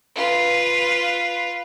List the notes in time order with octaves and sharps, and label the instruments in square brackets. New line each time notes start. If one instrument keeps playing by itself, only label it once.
[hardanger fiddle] F4 B4